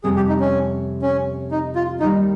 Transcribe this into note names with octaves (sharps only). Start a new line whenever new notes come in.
F2 C3 G3 C4 G#4
G4
D#4
C#4
C#4
D#4
F4
D#2 D#3 G3 D#4